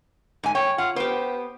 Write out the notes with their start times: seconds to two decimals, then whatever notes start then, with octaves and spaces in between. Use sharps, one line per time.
0.43 G#2 G#5
0.55 C#5 G5
0.78 F4 F#5
0.96 B3 G4 C5